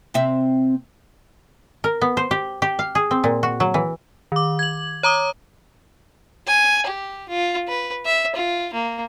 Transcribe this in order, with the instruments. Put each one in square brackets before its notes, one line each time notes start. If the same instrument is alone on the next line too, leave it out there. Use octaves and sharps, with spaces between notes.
[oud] C3 C4 E5
[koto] A#4
B3
C5
G4
G4
F5
G#4
C4
A#2
F#4
F#3
E3
[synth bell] D#3 D6
G#6 F#7
C#5 A#5 D6 D#6
[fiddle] G#5
G4
F4
B4
E5
F4
A#3